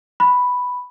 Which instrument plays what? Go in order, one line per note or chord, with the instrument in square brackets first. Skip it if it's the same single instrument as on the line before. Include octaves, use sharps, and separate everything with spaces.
[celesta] B5